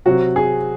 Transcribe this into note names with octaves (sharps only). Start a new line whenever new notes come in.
C3 F#3 C4 F#4
G#4